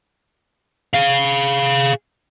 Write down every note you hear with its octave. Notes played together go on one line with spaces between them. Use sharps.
G#4 F5